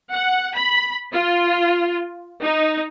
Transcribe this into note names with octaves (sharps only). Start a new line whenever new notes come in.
F#5
B5
F4
D#4